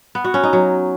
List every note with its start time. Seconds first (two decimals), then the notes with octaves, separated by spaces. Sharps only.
0.15 B3
0.24 F#4
0.34 C#4
0.43 D#4
0.53 F#3